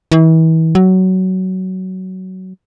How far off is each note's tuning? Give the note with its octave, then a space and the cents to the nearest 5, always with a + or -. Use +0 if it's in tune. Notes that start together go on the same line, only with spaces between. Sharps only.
E3 -35
F#3 +15